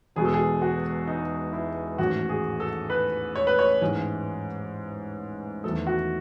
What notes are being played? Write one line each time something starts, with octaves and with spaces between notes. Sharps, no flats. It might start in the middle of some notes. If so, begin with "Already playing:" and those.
E1 E2 B2 G#3 G#4
A4
G#4
F#4
D#4
E4
A1 G#2 D#3 A3 F#4
G#4
A4
B4
C#5
B4
C#5
A1 G#2 E3 G#3
E2 D#3 A3 A4
F#4